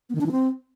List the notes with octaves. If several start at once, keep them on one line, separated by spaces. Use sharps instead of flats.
B3
D#3
D4
E3
C4